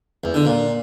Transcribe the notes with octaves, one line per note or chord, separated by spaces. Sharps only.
E2
D3
A#2